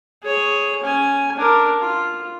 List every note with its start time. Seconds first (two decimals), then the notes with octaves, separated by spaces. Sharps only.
0.23 G#4 C#5
0.83 C#4 G#5
1.36 D4 A#4
1.80 F4